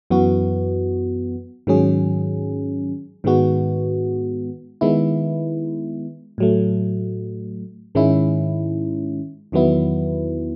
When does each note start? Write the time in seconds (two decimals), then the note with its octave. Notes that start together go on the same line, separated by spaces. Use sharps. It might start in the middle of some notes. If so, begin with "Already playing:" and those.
0.10 F#2 E3 B3 F#4
1.67 G#2 D#3 F#3 C#4 G#4
3.24 G#2 D#3 G#3 B3 F#4
4.81 D#3 G#3 B3 E4
6.38 A2 F#3 A3
7.95 G#2 D#3 G#3 C#4 E4
9.52 E2 D#3 F#3 B3 E4